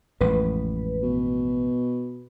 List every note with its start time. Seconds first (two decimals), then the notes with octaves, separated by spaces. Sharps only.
0.21 A1 F2 G#2 B4
1.03 B2